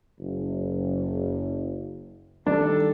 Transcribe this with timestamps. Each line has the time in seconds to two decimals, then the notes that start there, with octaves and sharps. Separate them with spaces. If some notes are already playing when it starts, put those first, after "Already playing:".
0.19 F#1
2.47 D#3 G3 A3 D4 D#4 G4 A4